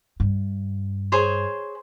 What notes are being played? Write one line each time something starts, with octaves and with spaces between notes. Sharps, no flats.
G2
G#4 C5 C#5